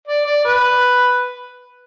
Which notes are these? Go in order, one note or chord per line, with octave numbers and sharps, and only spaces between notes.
D5
D5
B4